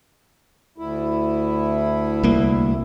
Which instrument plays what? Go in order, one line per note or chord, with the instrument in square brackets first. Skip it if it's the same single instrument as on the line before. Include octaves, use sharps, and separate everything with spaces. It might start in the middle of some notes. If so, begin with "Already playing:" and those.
[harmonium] D2 E4
[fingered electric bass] C2 A#3